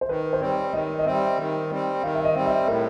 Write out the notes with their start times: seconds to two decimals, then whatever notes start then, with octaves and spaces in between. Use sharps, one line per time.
0.01 C5
0.08 D#3 B4
0.33 C5
0.41 G3 C4 C#5
0.73 D#3 D#5
0.99 D#5
1.06 G3 C4 E5
1.38 D#3
1.70 G3 C4
2.03 D#3 F5
2.14 E5
2.24 D#5
2.35 G3 C4
2.46 E5
2.67 A2 A#4